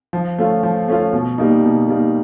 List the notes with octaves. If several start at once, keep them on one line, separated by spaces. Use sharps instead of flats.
F3
A3 C#4 F4
F3
A3 C#4 F4
B2
G3 A#3 D#4
B2
G3 A#3 D#4